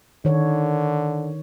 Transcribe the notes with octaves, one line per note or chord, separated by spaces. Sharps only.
D3 D#3 C#5